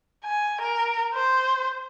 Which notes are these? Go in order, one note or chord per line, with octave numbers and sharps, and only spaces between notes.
G#5
A#4
C5